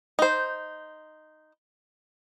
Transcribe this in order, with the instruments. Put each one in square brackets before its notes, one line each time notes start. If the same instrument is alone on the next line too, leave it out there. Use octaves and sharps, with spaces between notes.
[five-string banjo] D#4 C5